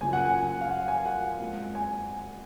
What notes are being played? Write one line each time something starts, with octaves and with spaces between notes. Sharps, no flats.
F#1 F#2 C#3 F3 G#5
F#5
G#5
F5
F#5
G#5
F#5
F#1 F2 F3 G#3
G#5